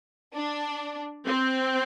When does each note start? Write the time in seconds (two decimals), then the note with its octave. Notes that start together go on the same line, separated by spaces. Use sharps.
0.35 D4
1.26 C4